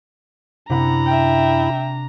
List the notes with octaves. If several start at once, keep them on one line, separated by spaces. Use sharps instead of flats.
F#2 C3 D4 E4 F#5 A#5 B5
E5 G5